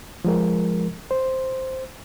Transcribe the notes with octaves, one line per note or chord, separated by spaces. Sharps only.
F3 G#3 A#4
C5